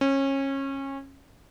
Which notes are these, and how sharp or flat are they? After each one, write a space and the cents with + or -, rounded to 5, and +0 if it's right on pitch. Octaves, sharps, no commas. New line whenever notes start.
C#4 -25